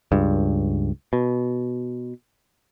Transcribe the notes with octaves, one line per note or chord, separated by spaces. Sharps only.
C#2 G2
B2